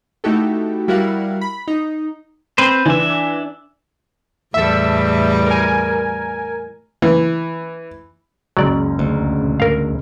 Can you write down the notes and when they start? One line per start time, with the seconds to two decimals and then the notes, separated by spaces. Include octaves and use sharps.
0.24 A3 D#4 E4 F#4 G4 A4
0.88 G3 E4 F#4 A#4 F5 F#5
1.41 B5
1.68 D#4
2.58 C4 B4 C5
2.86 E3 D4 E5
4.54 E2 A2 G3 A4 E5
5.46 A#4 G#5
7.02 E3
8.57 F#1 C#2 F#3 D5 A#5
8.99 D2
9.60 A#4 F5